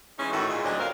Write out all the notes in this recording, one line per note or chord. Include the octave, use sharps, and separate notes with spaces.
E3 G#3 C#4 D#4
A2 D#3 E3 F#4 A4
A#2 G#3
D2 F#3 C4 C#4 D5 D#5
F2 C3 C4 A#4 F5